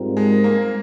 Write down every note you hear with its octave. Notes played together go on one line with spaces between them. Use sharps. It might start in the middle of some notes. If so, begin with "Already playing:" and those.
Already playing: G#2 G3 C4 F4 A#4
G#3
A#3